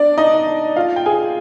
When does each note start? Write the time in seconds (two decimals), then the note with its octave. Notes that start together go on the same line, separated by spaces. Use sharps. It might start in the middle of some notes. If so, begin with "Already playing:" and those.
Already playing: D4 D5
0.18 D#4 D#5
0.76 F4 F5
0.96 G5
1.06 G#4 G#5